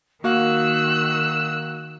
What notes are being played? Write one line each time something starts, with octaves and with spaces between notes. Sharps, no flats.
D#3 A#3 F#4 F5 E6 F#6